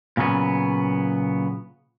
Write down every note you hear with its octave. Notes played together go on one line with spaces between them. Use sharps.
A#2 C#3 F#3 B3